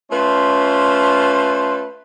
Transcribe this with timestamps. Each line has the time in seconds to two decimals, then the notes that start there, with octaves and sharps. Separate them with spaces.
0.12 A3 C#4 F4 B4 C5